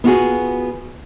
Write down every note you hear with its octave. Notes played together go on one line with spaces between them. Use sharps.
B3 F4 F#4 G#4